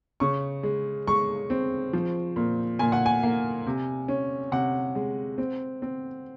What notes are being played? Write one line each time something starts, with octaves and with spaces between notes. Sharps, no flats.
C#3 C#6
G#3
G#3 C#6
C4
F3
A#2
A#2 G#5
F#5
G#5
A#3
C3
C#4
C3 F#5
G#3
C4
C4